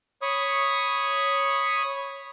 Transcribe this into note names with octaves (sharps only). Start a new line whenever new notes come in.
C#5 B5 C#6 D#6